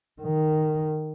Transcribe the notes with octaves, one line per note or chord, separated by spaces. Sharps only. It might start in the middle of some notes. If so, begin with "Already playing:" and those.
D#3